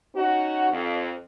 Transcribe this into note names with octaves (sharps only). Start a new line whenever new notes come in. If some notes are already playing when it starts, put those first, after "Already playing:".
C#4 D#4 F#4
F2